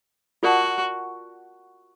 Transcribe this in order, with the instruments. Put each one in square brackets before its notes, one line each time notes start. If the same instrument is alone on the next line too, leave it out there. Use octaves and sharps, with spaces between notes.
[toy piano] F4 A#4 D5 F#5 A5 [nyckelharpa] F#4